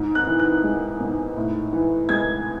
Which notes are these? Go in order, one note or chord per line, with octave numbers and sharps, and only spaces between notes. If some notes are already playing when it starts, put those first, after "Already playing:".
Already playing: G#2
F#6
E3
F#6
G#3
G#2
A2
E3
G#3 G#6